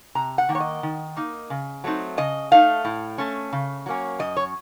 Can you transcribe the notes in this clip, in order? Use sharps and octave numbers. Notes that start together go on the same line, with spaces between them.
C3 A#5
F#5
D#3 A#3
C#5
D#5
D#3
A#3 D#4
C#3
F#3 A3 C4 D#4
C#3 D#5
A3 D#4 F5
A2
A3 C#4
C#3
F#3 A#3 C#4
F#2 D#5
C#5